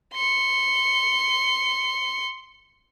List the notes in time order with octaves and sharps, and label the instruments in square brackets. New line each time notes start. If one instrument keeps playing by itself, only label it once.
[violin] C6 C#7